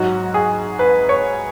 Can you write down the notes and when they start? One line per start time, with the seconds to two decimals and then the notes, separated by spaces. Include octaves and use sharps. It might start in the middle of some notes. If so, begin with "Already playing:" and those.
Already playing: G#2 F#3 F#4
0.34 G#4
0.79 B4
1.09 C#5